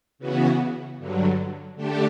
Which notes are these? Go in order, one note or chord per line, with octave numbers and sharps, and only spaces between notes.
C#3 E3 B3 F#4
G2 D3 F#3
D3 A3 D4 G4